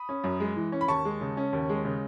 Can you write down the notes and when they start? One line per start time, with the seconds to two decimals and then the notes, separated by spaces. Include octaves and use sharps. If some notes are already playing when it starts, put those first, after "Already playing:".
Already playing: B5 D#6
0.09 C#4
0.24 F#2
0.40 G#3
0.56 E3
0.72 C#4
0.81 B5
0.88 D#2 A5 C#6
1.05 G#3
1.21 C#3
1.37 C#4
1.53 D#2
1.69 G#3
1.85 C#3